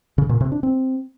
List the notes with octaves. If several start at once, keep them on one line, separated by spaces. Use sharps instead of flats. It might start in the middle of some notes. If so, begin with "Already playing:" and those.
C#3
A#2
C3
D4
C4